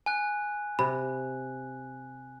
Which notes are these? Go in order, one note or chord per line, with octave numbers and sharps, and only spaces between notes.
G#5 F#6
C3 B5